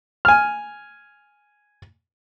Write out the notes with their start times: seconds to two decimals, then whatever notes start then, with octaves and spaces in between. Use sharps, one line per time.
0.25 G#5 F6